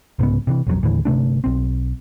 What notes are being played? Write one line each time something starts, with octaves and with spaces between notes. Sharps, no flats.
C2 G#2 C#3 B3
C3 E3
B1 F2 F3 F#3
D#2 A2 D3 E3
G1 C3 A3 D4
B1 C4